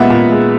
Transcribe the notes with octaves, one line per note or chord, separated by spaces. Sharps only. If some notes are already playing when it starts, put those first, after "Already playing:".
Already playing: A#2 G#3 B3 E5 F#5
A#2
G#3